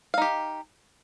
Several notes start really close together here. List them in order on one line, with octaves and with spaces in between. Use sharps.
F5 D#4 G4